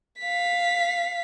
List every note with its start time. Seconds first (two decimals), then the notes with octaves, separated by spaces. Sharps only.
0.21 F5 B6